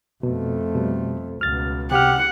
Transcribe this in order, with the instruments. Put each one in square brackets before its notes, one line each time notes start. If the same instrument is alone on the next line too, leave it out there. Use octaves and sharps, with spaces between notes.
[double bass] F2 A3 [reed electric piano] B2
[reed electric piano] B2 G3
[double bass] C#2 B2 [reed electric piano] F6 A6
[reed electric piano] C3 F6 [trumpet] G4 [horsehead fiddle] F#5